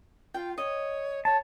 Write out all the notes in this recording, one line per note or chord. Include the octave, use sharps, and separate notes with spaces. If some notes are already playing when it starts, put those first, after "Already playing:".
F4 G5
C#5 D#5
C#5 A5